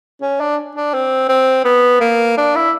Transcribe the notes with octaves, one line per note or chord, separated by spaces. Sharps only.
C#4
D4
D4
C4
C4
B3
A#3
D4
E4